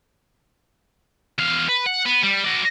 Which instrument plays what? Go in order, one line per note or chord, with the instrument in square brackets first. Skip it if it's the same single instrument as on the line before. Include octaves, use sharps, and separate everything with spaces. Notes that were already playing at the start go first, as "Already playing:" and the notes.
[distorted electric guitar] E2 F5
B4
F#5
B3
G3
F#4 D5